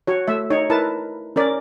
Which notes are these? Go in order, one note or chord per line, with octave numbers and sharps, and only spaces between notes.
F#4 C#5
A3 E5
D#4 C#5
E4 A#4 B4 A5
C#4 A#4 D5